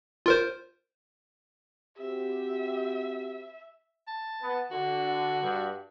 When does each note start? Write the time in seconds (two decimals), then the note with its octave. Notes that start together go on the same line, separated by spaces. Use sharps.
0.26 F4 A#4 C5
1.98 C4 F#4 G4 E5
4.08 A5
4.41 B3
4.71 D3 F#4
5.42 G2